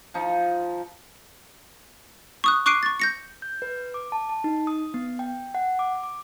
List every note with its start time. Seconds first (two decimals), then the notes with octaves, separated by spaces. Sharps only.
0.14 F3 D#4
2.44 C#6 D#6 F#6
2.66 C#6 D6 F#6 C7 D7 D#7
2.83 C#6 A6
3.00 G6 A#6 C#7
3.42 G6
3.62 B4
3.94 D6
4.12 A5
4.29 A5
4.44 D#4
4.67 D#6
4.94 B3
5.19 G5
5.55 F#5
5.79 D6
6.03 D6